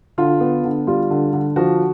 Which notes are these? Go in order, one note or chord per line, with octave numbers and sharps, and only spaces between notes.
D3 F4
B3
D3
G3 F4
D3
D3
F3 F#4